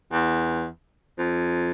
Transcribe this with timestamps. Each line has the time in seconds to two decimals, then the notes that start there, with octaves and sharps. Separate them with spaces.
0.12 E2
1.18 F2